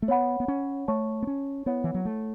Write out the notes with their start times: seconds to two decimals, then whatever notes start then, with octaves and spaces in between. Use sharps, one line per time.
0.02 A3
0.08 B3 C#5 F#5 B5
0.40 B3
0.48 C#4
0.88 A3 C#5 A5 C#6
1.22 B3
1.27 C#4
1.66 B3 E4 C#5 F#5
1.84 E3
1.94 F#3
2.05 A3